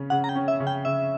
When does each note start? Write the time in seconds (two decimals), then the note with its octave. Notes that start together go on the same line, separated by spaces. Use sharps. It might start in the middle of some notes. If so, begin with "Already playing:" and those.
Already playing: C#3 C#4
0.10 C#3 F#5
0.24 A#5
0.29 G5
0.35 C#4
0.48 E5
0.60 C#3
0.67 G5
0.85 C#3 E5